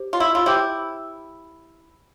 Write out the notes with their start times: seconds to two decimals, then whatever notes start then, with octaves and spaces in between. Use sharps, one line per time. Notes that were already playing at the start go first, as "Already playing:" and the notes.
Already playing: G4 C5
0.13 F4
0.20 E4
0.35 F4
0.46 E4 G4 C5 G5 D6 G6